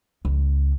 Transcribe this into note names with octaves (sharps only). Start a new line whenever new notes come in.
C#2